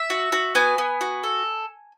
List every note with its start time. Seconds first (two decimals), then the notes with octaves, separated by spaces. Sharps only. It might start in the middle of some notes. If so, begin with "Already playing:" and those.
Already playing: E5
0.10 F#4
0.32 F#4
0.55 B3 G#5
0.78 B3
1.01 F#4
1.23 A4